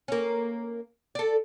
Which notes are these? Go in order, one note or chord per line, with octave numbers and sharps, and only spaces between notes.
A#3 C#4
A4 D5